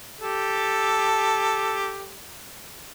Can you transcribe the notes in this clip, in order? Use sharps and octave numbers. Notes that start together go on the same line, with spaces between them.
G4 A4